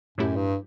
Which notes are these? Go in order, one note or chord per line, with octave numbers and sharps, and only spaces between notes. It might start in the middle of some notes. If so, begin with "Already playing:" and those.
F#2 A2 F#3 A3 E4 G4
G2